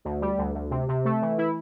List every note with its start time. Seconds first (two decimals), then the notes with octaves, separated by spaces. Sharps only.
0.05 D2
0.22 G3
0.38 D2
0.55 D2
0.71 C3
0.89 C3
1.05 A3
1.22 E3
1.38 E4